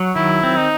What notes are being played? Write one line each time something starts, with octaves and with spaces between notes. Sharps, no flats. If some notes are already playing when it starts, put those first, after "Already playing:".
Already playing: F#3 F#4
D#3 E4
C4
D#4